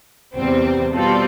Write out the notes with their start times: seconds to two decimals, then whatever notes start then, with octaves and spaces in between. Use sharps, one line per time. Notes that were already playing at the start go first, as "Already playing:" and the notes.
0.34 E2 C3 G3 C4
0.93 B2 G3 C4 F4 A4